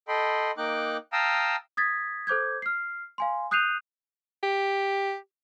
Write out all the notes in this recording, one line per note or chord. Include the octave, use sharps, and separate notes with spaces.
A4 D#5 G5 B5 C6
A#3 D#4 G5 D6 F#6
F5 G5 A5 A#5 D#6 E6
D#6 G#6 A6 B6
A4 C5 D6 G6 G#6
F6 C7
F5 G#5 C6
D#6 F#6 G6 C7 D#7 F7
G4